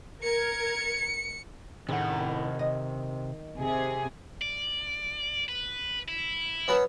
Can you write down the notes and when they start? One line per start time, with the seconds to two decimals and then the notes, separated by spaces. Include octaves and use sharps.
0.23 A#4 G#6 C#7
1.89 A2 C3 D#3 C#4 G#4 F#5
2.59 D#5
3.60 C3 G#4
4.41 D5
5.48 B4
6.08 E4
6.68 F#3 B3 C#4